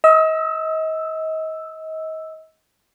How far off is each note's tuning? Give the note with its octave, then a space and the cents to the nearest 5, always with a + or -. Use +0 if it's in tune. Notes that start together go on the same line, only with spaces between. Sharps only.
D#5 +35 E6 +0